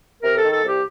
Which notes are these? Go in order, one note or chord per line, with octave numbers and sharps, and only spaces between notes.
C3 A#4
A4
D#3
A4
C2 G4